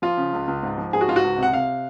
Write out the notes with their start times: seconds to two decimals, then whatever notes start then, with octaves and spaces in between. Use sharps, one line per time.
0.02 F3 F4
0.17 C#3
0.33 C#2
0.47 C#2
0.63 G#2
0.78 F3
0.93 G#2 G#4
1.01 F#4
1.08 G#2 F4
1.16 F#4
1.23 C#2
1.38 C3 F#5
1.53 C3 F5